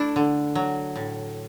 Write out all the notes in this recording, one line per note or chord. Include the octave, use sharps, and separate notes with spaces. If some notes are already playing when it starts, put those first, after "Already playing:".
Already playing: A3 D4 E4
D3
F#3
A2